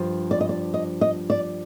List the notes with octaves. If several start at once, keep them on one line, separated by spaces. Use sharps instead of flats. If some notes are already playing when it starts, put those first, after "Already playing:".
Already playing: G2 F3
D5
D#5
D5
D#5
D#5
D5